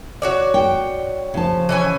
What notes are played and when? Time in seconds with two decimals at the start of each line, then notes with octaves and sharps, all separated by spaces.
0.22 F#4 C#5 D5
0.54 G5
1.34 C#3 F3 A5
1.69 E3 C#4 G#5